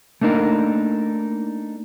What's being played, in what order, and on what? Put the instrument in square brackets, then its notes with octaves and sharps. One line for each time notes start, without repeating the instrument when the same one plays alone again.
[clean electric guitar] A3 A#3 D4 D#4 A#4